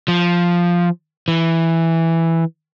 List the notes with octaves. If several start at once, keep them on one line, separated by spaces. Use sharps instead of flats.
F3
E3